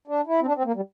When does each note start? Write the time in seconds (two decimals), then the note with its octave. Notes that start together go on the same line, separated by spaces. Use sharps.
0.08 D4
0.27 E4
0.41 C4
0.46 D4
0.56 C4
0.65 A#3
0.75 G3